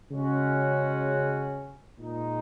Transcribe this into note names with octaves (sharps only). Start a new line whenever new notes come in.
C#3 G#3 C#4 F#4
A#2 G#3 D#4